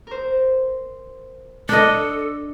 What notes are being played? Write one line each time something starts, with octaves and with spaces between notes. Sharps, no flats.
A#4 C5
D4 A4 D#5